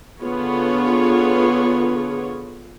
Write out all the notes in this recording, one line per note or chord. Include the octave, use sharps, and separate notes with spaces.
D3 B3 F4 G#4 C#5